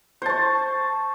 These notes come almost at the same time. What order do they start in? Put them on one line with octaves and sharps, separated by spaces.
C5 A5 C#6